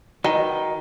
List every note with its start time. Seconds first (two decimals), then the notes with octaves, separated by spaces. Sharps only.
0.24 D#3 F#4 B4 G5